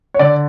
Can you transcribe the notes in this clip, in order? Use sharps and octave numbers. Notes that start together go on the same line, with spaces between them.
C#5
D3 D5